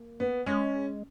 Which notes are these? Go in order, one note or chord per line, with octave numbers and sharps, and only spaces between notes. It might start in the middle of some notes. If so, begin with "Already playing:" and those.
Already playing: A#3
B3
G#3 C#4